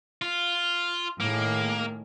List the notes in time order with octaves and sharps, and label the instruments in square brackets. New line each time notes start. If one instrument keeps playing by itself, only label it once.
[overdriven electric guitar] F4
[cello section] A2 D#3 G#4 [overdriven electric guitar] A#3